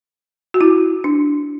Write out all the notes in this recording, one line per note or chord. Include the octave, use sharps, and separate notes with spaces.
F#4
E4
D4